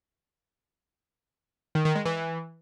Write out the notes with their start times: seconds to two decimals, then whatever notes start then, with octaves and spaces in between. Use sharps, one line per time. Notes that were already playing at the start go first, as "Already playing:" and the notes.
1.75 D#3
1.85 D#3
1.95 G#3
2.05 E3